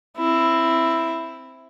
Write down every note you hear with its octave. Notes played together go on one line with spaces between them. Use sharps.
C4 E4